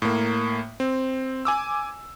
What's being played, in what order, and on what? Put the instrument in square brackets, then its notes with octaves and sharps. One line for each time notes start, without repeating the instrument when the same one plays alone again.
[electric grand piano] A2 A#3
C4
G#5 D6 E6